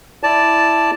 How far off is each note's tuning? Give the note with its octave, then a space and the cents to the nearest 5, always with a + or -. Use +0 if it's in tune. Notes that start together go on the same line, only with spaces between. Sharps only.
E4 +0 D5 +0 A5 +0